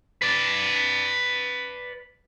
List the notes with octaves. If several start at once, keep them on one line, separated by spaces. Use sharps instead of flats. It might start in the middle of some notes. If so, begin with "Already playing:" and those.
B4 D5